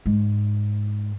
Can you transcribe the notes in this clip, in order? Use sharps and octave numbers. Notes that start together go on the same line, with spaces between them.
G#2